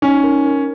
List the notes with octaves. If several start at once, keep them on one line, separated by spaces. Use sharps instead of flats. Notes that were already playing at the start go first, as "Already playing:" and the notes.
C#4 D#4
A#4
A#4